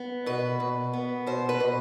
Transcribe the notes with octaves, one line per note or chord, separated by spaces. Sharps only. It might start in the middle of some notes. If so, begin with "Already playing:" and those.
Already playing: B3
B2 B4
B2
B3
B2 C5
B4
B2